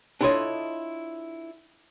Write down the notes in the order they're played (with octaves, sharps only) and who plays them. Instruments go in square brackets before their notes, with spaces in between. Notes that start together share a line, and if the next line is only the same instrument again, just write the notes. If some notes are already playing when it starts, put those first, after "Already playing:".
[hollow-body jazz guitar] D4 E4 F4 A4 C#5 D#5